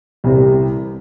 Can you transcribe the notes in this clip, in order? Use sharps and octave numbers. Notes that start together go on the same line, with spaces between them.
C2 C3 E3 G3 C4